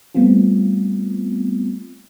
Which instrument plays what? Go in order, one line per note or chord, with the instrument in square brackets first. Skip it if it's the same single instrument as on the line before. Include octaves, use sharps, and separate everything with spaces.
[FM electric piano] G3 A3 B3 C4 F4